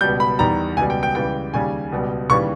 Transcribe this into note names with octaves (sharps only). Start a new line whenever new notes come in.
C#2 B2 G3 G6
B5
E2 D#3 G3 A#5
C#2 B2 G3 G#5
G5
G5
C#2 C#3 E3 G3 G5
D#2 C#3 G3 G#5
C#2 B2 G3
D#2 C#3 E3 G3 C#6